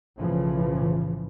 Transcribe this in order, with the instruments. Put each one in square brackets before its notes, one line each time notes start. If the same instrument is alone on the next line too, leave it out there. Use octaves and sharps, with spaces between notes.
[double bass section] B1 A2 C#3 E3 F3